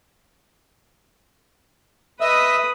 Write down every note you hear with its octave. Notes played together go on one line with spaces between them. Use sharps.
B4 D#5 E5 D#6 E6